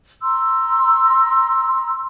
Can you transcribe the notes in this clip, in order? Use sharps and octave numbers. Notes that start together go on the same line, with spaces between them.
A#5 C6 E6